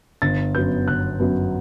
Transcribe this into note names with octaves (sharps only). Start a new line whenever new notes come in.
G1 A6
F#2 F#3 B3 G6
G1 F#6
F#2 F#3 B3